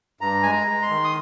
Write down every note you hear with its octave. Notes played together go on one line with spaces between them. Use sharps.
G2 A#5
G#3 G#5
A#5
G#3
C6
D#3
D#6